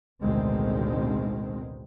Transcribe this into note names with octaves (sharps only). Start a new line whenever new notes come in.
A1 D2 B2 D#3 G#3 C4